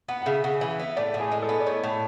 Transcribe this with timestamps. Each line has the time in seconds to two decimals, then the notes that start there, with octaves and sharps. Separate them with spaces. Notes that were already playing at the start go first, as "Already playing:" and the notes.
0.08 B3 F#5
0.22 F#5
0.26 C#3 E5
0.44 C#3 F#5
0.61 E3
0.70 F#5
0.79 B3 E5
0.96 A2 D5
1.14 A2
1.20 G#4
1.32 G#3
1.43 A4
1.49 B3
1.60 D5
1.66 A2 C#5
1.83 A2